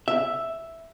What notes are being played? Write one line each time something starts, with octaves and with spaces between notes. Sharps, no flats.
E5